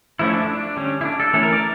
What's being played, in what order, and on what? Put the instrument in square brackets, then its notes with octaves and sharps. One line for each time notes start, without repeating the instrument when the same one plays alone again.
[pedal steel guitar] F3 A3 C#4 E4
D4
D4
D3 G3 C#4
E4
D4
A4
E3 A3 C#4 A4
A#4
D5